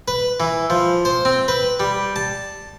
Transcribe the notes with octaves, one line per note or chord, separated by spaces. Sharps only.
B4
E3
F3
C5
C4
B4
G3
A5